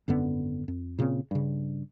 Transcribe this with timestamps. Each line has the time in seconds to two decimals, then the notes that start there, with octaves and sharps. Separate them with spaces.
0.08 G#1 F#2 D3 B3
0.68 F2
0.98 A#2 C#3 B3 C4
1.31 G2 C#3